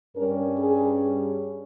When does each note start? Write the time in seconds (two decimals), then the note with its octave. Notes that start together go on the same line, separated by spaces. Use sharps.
0.15 G2 G3 C#4 A#4
0.58 G#4